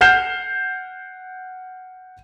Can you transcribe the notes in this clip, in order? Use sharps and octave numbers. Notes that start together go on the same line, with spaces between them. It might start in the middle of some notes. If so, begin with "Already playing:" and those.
F#5 F6 G6 C7 E7